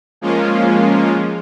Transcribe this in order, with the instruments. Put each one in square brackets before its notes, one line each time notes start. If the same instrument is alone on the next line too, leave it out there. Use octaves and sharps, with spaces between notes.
[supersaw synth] F3 G#3 A#3 C#4 F4